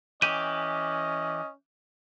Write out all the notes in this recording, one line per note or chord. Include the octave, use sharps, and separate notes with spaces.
E3 C#4 G4 D#5 D#7